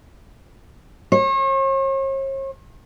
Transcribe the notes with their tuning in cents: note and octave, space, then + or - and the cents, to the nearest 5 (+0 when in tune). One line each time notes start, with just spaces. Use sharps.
C#5 -45